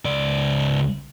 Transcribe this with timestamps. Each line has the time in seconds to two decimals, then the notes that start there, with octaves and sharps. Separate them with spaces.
0.05 C#2 D5